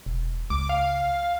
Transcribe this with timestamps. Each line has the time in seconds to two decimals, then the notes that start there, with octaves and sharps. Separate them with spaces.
0.06 E1
0.50 C#2 D6
0.69 F5